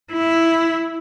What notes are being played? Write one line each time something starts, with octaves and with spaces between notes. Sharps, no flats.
E4